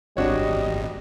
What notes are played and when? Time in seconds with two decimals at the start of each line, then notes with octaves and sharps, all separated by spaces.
0.17 G#1 G3 D4 F#4 C#5 D#5